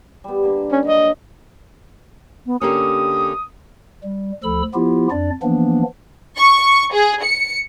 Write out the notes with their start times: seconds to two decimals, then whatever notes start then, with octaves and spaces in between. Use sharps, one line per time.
0.24 G3 B3
0.43 D3 A#3
0.72 C#4
0.87 F#3 D#5
2.46 B3
2.61 D3 A#3 C#4 G4 D#6
4.03 G3
4.43 D2 F3 A4 B5 E6
4.74 F3 B3 E4 F4 G4
5.11 F2 D4 D5
5.42 E3 F3 A#3 B3 D4
6.37 C#6
6.93 G#4
7.23 C#7